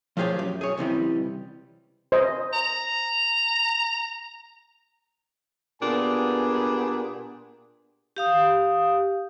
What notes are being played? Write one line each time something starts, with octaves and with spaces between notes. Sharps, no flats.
F3 F4 G4 G#4 C#5 D5
F#2
G#4 C#5
C#2 C3 E3 G3
C5 D#5
A#5
A#2 B3 D4 G4 G#4 G#5
G4 F5 D#6